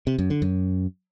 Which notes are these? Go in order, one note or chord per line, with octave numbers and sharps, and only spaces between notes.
C3
F#2
D3
F#2